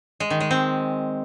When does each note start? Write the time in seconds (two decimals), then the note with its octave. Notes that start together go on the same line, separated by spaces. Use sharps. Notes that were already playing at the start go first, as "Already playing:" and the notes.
0.20 G#3
0.30 D#3
0.41 G#3
0.51 C4